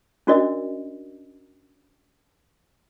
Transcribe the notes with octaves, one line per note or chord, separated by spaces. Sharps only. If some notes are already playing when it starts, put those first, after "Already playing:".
C#4 D4 F#4 A#4 D5 D#5